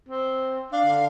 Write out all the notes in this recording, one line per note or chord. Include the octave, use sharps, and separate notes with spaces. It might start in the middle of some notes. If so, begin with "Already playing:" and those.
C4
D4 F5
D3